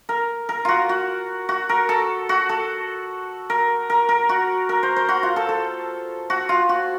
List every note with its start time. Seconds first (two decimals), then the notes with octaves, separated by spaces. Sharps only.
0.09 A#4
0.49 A#4
0.65 F4 F#4
0.89 F#4
1.49 F#4
1.69 A#4
1.89 A4
2.29 F#4
2.49 A4
3.50 A#4
3.90 A#4
4.09 A#4
4.29 F#4
4.69 A#4
4.83 C5
4.96 C5
5.09 F#4
5.23 F4
5.36 A4
5.49 A4
6.30 F#4
6.49 F4
6.69 F#4